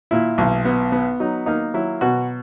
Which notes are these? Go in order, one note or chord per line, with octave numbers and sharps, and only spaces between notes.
A#2 E4
B1
B3
B3
F#3 D#4
A#3 D#4
F#3 E4
B2 F#4